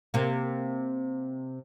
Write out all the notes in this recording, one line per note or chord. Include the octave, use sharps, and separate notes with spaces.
C3 A#3